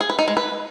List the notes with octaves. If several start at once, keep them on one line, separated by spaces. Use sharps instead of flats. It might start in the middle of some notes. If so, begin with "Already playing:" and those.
G#4
B4
D#4
G#3
B4